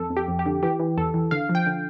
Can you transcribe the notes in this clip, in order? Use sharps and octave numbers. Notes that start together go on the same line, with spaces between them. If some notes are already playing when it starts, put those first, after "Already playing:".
Already playing: F2 A4
F2
G4
F2
G4
D3
E3 G4
E3
E2 A4
E3
D3 F5
F3
G5
D3